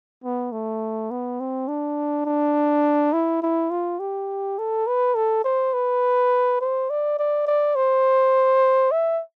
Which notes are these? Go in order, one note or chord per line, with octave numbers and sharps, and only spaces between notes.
B3
A3
B3
C4
D4
D4
E4
E4
F4
G4
A4
B4
A4
C5
B4
C5
D5
D5
D5
C5
E5